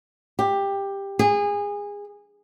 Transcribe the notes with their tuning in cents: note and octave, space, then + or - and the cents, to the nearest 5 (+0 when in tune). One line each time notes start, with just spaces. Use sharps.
G4 +10
G#4 -25